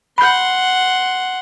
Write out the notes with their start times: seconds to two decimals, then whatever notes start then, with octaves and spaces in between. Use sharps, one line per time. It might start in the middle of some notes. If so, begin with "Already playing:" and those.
0.18 F#5 B5 C6 G6